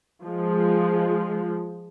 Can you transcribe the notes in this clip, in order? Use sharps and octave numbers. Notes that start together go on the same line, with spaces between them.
F3 G#3